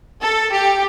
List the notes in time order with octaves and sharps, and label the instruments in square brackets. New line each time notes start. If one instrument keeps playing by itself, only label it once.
[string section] A4
G4